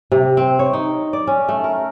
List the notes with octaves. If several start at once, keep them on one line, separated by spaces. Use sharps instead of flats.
C3
C4
C#5
D#4
D5
C#4
A3
A#4